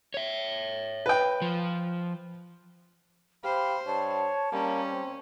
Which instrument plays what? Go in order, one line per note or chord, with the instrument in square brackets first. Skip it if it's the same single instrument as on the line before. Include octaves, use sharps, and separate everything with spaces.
[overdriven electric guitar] C#5 E5
[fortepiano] B4 G5
[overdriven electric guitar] F3
[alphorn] G4 [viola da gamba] C5 [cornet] F5 [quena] B5
[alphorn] G2 [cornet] C#5 [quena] A5
[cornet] G3 [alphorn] A#3 [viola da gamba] C#4
[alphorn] C4